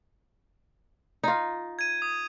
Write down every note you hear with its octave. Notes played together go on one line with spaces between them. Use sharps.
D#4 F4
G#6 D#7
D#6